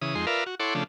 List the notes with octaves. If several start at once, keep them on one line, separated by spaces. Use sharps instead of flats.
C#3 E3 D#6
F2 G#3 D#4 C6
F4 A#4 B4 D5 E5 F5
F#4
E4 A4 C#5 F#5 C6 D6
C#3 F3 A3 D4